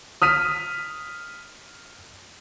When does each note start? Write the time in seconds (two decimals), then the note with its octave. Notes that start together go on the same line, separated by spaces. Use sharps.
0.22 D#6 F6 B6 D#7